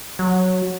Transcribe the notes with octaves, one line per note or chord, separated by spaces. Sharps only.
F#3